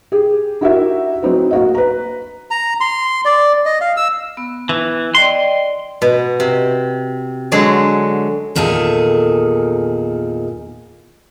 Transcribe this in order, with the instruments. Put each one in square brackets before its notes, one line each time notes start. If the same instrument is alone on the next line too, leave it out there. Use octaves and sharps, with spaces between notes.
[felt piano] G4 G#4
D#4 E4 F#4 G4 A#4 E5
F#3 C4 D#4 E4 B4
A#3 F#4 D#5
B4 A#5
[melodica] A#5
C6
D5
D#5
F5
E6
[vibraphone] B3
[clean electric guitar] E3
[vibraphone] D5 D#5 G5 [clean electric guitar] C6
[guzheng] B2
C3
D3 F#3 G#3 F#4 G#4
[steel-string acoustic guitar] E2 A#2 D#3 G#4 A4